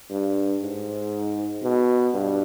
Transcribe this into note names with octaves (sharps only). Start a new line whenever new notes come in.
G2
G#2
B2
G2